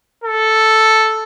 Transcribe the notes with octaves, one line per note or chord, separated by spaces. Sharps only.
A4